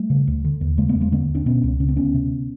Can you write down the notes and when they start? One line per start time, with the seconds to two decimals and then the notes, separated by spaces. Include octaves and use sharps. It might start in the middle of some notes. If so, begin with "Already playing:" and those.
Already playing: G3 A3
0.10 C#3
0.27 D2
0.44 D3
0.61 D#2
0.78 C#3 G#3 A#3
0.89 A3 B3
0.95 E2
1.00 G#3 A#3
1.12 D3 A#3 C4
1.29 D#2
1.35 C4 D4
1.46 B2 B3 C#4
1.63 C#2
1.80 C#3 C#4
1.88 C4
1.96 D2 B3 C#4
2.14 C3